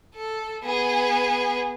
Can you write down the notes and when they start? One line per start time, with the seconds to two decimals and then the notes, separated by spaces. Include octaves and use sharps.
0.15 A4
0.63 B3 G#4